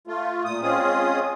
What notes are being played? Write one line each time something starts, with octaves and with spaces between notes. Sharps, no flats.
A3 F4
A#2 D#6
G#3 C4 C#4 F4 G#4 D#6